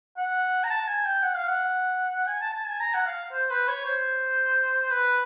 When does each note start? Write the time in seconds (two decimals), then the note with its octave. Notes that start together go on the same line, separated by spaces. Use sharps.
0.17 F#5
0.64 A#5
0.70 A5
0.88 G#5
1.05 G5
1.23 F#5
1.36 F5
1.48 F#5
2.27 G#5
2.41 A5
2.54 A5
2.67 G#5
2.80 A#5
2.94 F#5
3.06 F5
3.32 C5
3.50 B4
3.68 C#5
3.85 C5
4.90 B4